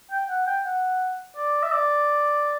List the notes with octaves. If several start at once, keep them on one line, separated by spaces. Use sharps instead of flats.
G5
F#5
G5
F#5
D5
E5
D5